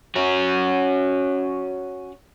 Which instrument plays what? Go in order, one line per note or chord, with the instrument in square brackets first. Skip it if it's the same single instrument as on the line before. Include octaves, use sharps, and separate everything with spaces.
[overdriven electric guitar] C#4 F#4